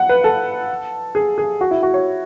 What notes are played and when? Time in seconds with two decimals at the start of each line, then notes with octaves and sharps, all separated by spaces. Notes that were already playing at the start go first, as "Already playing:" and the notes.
Already playing: F#5
0.09 B4
0.24 A4
1.15 G#4
1.38 G#4
1.61 F#4
1.71 E4
1.83 F#4
1.94 C#5